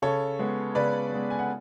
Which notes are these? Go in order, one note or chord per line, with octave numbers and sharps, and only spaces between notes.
C#3 A4 C#5
G#3 B3
C#3 B4 D5
G#3 B3
G#5
F#5